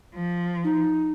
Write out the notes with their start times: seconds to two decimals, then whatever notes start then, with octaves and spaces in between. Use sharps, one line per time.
0.15 F3
0.64 D#4